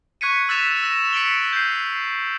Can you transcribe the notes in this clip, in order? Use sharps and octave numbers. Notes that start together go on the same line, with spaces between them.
C#6 F#6 G#6 B6 C#7 D#7
E6 F#6 A6 B6 E7 F7
E6 A#6 E7
B6 C#7 D7 F#7 G7
G6 C7